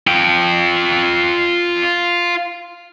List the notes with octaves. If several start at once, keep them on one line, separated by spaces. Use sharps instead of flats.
F4 G5